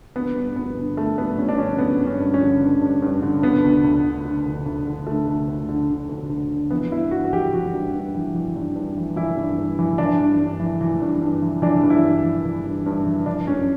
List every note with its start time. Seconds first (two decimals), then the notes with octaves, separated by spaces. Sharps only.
0.15 D3 B3
0.35 G2
0.56 G2 B3
0.77 D3
0.97 D3 A3
1.18 G2 B3
1.38 G2 C#4
1.49 D4
1.58 D3 C#4
1.78 D3 B3
2.00 G2
2.06 C#4
2.20 G2
2.34 C#4
2.41 D3
2.60 D3
2.81 G2
3.02 G2
3.22 D3
3.42 D3 B3
3.64 D2
3.84 D2
4.04 D3
4.25 D3
4.46 D2
4.66 D2
4.87 D3
5.06 D3 A3
5.27 D2
5.48 D2
5.69 D3
5.90 D3
6.09 D2
6.30 D2
6.51 D3
6.71 E3 B3
6.91 G2 E4
7.11 G2 F#4
7.24 F#4
7.33 E3 G4
7.53 E3 F#4
7.73 G2
7.94 G2
8.14 E3
8.34 E3
8.55 G2
8.75 G2
8.97 E3
9.16 E3 E4
9.37 G2
9.58 G2
9.79 E3
9.98 E3 D4
10.20 G2
10.39 G2
10.60 E3
10.81 E3
11.01 G2
11.21 G2
11.42 E3
11.62 E3 D4
11.83 G2
11.90 E4
12.04 G2
12.24 E3
12.45 E3
12.65 G2
12.86 G2
13.06 E3
13.26 E3 D4
13.47 F#2 C#4